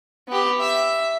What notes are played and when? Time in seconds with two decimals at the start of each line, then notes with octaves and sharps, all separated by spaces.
0.28 B3 G4
0.60 E5